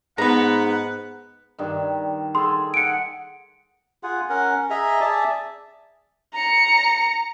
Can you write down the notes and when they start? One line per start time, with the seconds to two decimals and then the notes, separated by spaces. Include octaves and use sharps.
0.18 G#2 B3 B4 F#5 A#5
1.59 G2 D#3
2.35 G#4 A4 C6
2.74 F#5 G#5 C#7 D7
4.03 F4 G#4 F#5
4.30 C#4 A#4 F#5
4.70 G#4 D#5 E5 A#5
5.01 G#4 D5 E5 A5
6.34 A#5 C#7